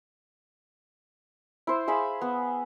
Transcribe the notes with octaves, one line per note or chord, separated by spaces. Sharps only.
E4 C5
G#4 E5 F5 B5
B3